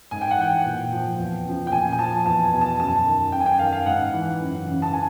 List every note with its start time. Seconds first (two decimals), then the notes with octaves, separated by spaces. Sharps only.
0.11 G#2 G#5
0.21 G5
0.31 F#5
0.39 E3 G5
0.66 A#2
0.93 F3
1.18 E2
1.45 C#3 F3
1.67 G5
1.72 A#2 G#5
1.92 G#5
1.99 F3 A5
2.25 E2 A5
2.44 G#5
2.53 B2
2.61 A5
2.79 F#2 A5
3.06 D#3
3.32 F#2 G5
3.40 G#5
3.46 G5
3.59 D#3 F5
3.72 F5
3.86 G#2 F#5
4.13 E3
4.40 F#2
4.66 C#3 E3
4.82 A5
4.93 G#5